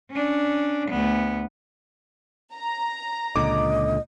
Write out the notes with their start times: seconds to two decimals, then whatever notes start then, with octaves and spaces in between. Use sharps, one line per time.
0.11 C#4 D4
0.88 D2 B3
2.54 A#5
3.36 C#2 A#2 D3 D#5 D6